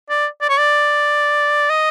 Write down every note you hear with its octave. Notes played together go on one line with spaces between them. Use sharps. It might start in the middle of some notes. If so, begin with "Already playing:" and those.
D5
D5
C#5
D5
D#5